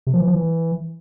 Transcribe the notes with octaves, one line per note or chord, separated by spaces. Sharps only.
C3
F3
E3
F3
E3